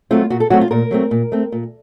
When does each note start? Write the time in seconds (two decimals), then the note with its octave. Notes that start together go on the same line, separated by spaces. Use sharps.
0.11 F#3 A3 C4 F4
0.30 A#2 F#4
0.40 A4
0.50 F#3 A3 C4 F#4
0.61 F4
0.71 A#2 A#4
0.91 F#3 A3 C4
1.11 A#2
1.32 A3 C4
1.52 A#2